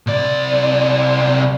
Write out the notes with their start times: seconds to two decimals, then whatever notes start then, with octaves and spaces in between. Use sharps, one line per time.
0.07 C2 D5